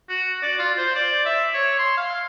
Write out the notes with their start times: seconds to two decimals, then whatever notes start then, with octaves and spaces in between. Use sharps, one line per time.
0.09 F#4
0.43 D5
0.59 F4
0.77 C5
0.95 D5
1.26 E5
1.54 C#5
1.79 C6
1.97 F5